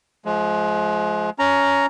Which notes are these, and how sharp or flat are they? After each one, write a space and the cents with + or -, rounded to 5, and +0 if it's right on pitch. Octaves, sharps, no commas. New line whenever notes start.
F3 +0 G#3 +30
C#4 +15 A#5 +0